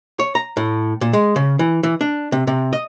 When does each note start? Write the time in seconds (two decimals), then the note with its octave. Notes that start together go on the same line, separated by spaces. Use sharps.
0.19 C#5
0.35 A#5
0.57 A2
1.01 A#2
1.13 G#3
1.36 C#3
1.59 E3
1.83 E3
2.01 D4
2.32 C3
2.47 C3
2.73 D#5